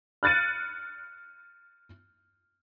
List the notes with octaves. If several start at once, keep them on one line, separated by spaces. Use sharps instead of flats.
F6 F#6 A6 C#7 D#7